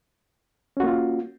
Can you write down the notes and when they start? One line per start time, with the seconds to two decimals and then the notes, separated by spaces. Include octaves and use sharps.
0.77 C#4
0.80 F#4
0.83 A#3
0.87 F4